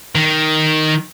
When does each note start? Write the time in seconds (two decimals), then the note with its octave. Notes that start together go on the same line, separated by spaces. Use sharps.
0.15 D#3